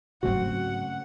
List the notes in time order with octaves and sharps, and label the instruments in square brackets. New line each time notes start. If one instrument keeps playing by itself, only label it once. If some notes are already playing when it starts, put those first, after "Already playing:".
[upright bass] G#2 F#3 [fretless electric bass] C#3 A3 C4 [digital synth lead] F#4 [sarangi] F#5